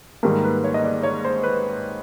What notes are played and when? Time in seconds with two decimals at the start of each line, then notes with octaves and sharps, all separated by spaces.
0.23 G#2 D#3 G3 A#3 A#4
0.44 B4
0.64 C#5
0.74 D#5
0.83 D5
1.03 C#5
1.25 C5
1.43 B4